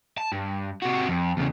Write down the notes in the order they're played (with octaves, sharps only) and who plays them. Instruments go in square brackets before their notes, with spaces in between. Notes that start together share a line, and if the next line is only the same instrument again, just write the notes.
[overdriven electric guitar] A5
G2
C3 F#4
F2
E2 C#3